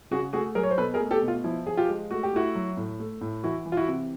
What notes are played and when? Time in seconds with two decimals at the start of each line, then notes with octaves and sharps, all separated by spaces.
0.11 C#3 F#4 G#4
0.33 A3 F#4 G#4
0.55 F#3 G#4 A#4
0.63 C#5
0.70 C5
0.78 B2 A4 B4
0.94 G#4 A#4
1.00 A3
1.11 G4 A4
1.22 B2
1.28 F4
1.44 F3 E4
1.67 F3 G#4
1.77 F4 G4
1.88 G#3
2.11 A3 F#4
2.23 G4
2.33 A3 E4 F#4
2.55 F#3
2.77 A2
3.00 A3
3.21 A2
3.43 E3 E4 F#4
3.66 E3
3.72 F4
3.77 E4 F#4
3.88 C3